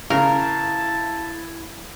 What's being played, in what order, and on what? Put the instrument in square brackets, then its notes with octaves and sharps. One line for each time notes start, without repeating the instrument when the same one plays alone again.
[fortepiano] C#3 [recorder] E4 [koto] A#4 [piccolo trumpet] A5